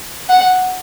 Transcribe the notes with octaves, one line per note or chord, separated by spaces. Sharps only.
F#5